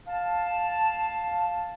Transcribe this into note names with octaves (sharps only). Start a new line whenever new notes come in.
F5 A5